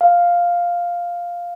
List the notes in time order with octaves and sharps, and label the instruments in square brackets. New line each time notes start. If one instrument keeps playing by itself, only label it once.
[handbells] F5